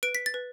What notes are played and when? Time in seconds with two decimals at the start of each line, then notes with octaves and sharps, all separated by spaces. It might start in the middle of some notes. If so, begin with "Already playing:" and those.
0.03 B4 D7
0.15 B6
0.26 A6
0.34 B4